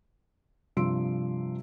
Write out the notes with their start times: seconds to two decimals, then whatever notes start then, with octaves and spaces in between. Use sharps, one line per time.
0.77 G2 C3 F3 C6 E6 D7